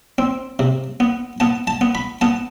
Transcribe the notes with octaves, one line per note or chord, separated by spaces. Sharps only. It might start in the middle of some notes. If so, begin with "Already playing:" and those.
C4
C3
B3
B3 A5
A5
B3
B5
B3 A5